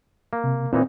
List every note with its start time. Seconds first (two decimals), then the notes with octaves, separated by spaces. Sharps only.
0.33 A#3
0.44 C3
0.73 A#2 E3 C4 D#4